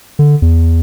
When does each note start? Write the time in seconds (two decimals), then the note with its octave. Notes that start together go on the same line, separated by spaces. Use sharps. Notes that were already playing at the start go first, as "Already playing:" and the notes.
0.19 D3
0.42 E2